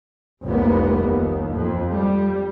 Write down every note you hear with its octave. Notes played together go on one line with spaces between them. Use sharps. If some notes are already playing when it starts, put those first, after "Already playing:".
F1 C2 A#3 B3
D#2
F2
G3